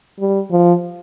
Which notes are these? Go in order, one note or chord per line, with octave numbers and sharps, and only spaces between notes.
G3
F3